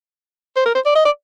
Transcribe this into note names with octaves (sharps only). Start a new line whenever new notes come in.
C5
A#4
C5
D5
D#5
D5